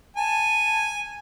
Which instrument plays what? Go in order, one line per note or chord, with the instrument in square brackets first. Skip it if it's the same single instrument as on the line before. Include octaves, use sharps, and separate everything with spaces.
[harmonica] G#5 [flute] A5